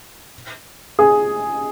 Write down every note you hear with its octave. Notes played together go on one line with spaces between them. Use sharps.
G#4